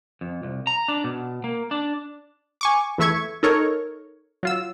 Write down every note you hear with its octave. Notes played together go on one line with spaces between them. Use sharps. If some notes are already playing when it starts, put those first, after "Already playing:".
F2
C2
A#5
D4
B2
A#3
D4
G#5 C#6 D6
E2 E3 A3 E5 C#6 G#6
D#4 A4 A#4 C#5
F#3 F4 E6